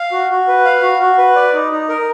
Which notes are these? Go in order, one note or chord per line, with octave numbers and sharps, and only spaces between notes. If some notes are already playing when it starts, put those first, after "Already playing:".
Already playing: F5
F#4
F#4
B4
F5
F#4
F#4
B4
D5
D#4
D#4
A#4